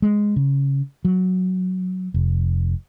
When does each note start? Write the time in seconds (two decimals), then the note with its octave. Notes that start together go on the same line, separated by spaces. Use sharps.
0.02 G#3
0.36 C#3
1.05 F#3
2.14 F1